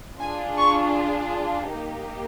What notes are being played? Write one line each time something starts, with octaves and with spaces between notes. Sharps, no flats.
D4 F4 G#4 G#5
C#6
A#3 D#4 G4